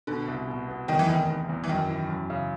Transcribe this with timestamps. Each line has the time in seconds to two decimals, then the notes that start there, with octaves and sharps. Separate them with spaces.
0.07 B2 D3
0.28 C2
0.48 B2
0.68 B3
0.88 E2 D#3
0.99 E3
1.08 F1 D#3
1.29 E2
1.49 E2
1.64 E3
1.69 F#2 D#3
1.89 E3
2.09 F#2
2.30 C#3